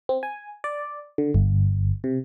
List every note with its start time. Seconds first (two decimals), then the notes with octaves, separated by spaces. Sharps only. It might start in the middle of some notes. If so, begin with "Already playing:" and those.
0.09 C4
0.23 G#5
0.64 D5
1.18 D3
1.34 G1
2.04 C3